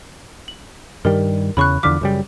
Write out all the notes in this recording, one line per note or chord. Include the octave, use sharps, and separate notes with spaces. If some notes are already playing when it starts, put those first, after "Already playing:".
F#7
G2 D#3 G3 A#4
E2 C#3 B5 C#6 F#6
E2 D3 F3 D6 F6 B6
F#2 C#3 G3